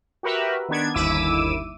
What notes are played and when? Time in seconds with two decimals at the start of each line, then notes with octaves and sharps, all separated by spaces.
0.23 F#4 G4 A#4 B4 E5
0.69 D#3 B3 D4 G#6
0.94 G1 D#2 E4 D6 E6 D#7